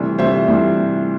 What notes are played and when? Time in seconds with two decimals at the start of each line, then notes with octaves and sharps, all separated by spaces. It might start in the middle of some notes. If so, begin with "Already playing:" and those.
Already playing: D2 C3 E3 G3
0.18 D2 C3 E3 G3 C5 E5
0.48 D2 C3 E3 G3